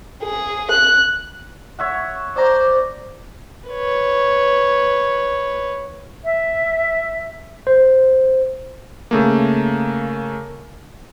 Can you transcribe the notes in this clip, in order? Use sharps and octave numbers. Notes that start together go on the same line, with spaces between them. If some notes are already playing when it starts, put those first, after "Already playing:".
G#4
F#6
C#5 E5 F#5
C5 D5 A#5 D6
B4 C#5
E5
C5
C#3 A3 A#3